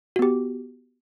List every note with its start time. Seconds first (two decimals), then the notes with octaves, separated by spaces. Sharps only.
0.16 F#4
0.19 B3
0.22 G4